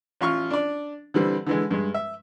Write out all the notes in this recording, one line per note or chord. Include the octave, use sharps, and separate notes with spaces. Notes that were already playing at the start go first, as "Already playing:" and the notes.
A1 F4 C#6 F6
D4 D5
D3 E3 G3 C4
D3 E3 G#3
G2 G#3
E5